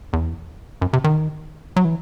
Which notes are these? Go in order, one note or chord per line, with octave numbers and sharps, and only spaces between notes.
E2
F#2
C3
D#3
F#3
E3